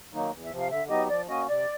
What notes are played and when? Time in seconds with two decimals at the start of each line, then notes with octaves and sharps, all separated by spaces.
0.12 D#3 F#3 A#3 D#4
0.31 E2
0.44 E5
0.50 C3 F3
0.60 F5
0.69 D3 E5
0.89 F#3 B3 D#4 G4 D#5
1.08 F3 D5
1.28 A#3 C#4 F#4 D#5
1.47 C3 D5